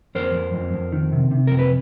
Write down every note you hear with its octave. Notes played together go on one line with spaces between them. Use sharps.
F2 A#4 C5
F2
F2
F2
D#3
C3
C3
F2 A#4
B4